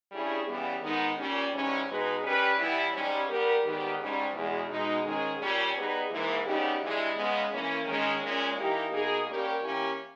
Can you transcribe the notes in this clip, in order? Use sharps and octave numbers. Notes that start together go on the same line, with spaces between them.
G2 G3 C#4 E4 G#4
C#3 E3 G3 B3
G#2 D#3 G#3 B3 D#4
A#2 G3 C#4
G#2 E3 G3 C#4
B2 G#3 D#4 G#4 B4
G3 C#4 G4 B4
E3 G3 B3 E4
G#2 G3 C#4
G3 B3 G4 A#4
G#2 D#3 G3 B3 G4
G#2 G3 C#4
E2 B2 G#3
B2 G#3 D#4
G#2 D#3 G#3 C#4 G#4
A#2 G3 C#4
G3 B3 D#4 G#4 B4
G#2 E3 A#3
C#3 G3 B3 D#4 G4
G2 E3 G#3
C#3 G#3 B3
E3 A#3 C#4
D#3 G#3 C#4
A#2 G#3 C#4
E3 A#3 D#4 G4
B2 A#3 D#4 G#4
G3 A#3 C#4 G4 A#4
E3 A#3 C#4 G4